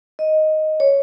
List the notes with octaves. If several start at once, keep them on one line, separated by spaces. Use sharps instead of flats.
D#5
C#5